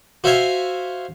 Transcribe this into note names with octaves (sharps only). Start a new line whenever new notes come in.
F#4 C5 E5 F5 G#5